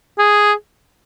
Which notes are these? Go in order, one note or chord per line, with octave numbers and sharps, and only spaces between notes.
G#4